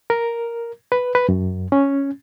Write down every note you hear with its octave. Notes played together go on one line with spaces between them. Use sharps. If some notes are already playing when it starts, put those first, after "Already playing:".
A#4
B4
B4
F#2
C#4